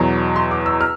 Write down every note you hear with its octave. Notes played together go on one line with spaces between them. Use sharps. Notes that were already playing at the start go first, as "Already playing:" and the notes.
Already playing: E2 B2 F#3
C6
D6
E6
F6